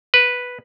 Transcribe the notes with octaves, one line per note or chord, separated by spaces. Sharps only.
B4